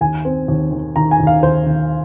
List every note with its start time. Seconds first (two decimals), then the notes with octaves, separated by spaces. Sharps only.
0.01 D#2 G#5
0.25 C4
0.48 D#2
0.72 D#3
0.96 D#3 A#5
1.11 G#5
1.20 D#2
1.27 F5
1.43 D#2 C5
1.66 D#3